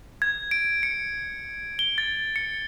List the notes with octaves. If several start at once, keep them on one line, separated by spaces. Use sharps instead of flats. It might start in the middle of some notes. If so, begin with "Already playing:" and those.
G#6
D7
C#7
G7
A6
C#7